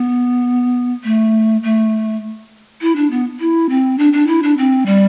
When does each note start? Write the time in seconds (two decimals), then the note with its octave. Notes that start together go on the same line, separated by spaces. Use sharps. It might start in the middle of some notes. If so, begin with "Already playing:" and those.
Already playing: B3
1.04 A3
1.63 A3
2.81 E4
2.96 D4
3.11 B3
3.40 E4
3.70 C4
3.98 D4
4.13 D4
4.27 E4
4.43 D4
4.58 C4
4.86 G3